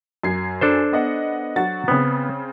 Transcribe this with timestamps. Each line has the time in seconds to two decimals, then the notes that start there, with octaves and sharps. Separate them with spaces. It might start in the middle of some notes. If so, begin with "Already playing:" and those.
0.23 F#2 G#6 C7
0.61 D4 A4 C5
0.92 B3 D#5 F#5
1.56 F#3 F#4 A6
1.88 C#3 B3 C4